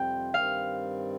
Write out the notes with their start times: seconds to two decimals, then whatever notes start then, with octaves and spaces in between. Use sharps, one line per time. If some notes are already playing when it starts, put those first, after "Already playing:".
Already playing: F2 C3 G3 C4 F4 G5
0.34 G2 D#3 G3 C4 F5